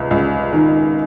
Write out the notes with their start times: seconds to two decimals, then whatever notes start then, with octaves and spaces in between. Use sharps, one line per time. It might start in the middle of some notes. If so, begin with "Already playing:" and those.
Already playing: C#2 C3 B4
0.11 C#2
0.53 D#3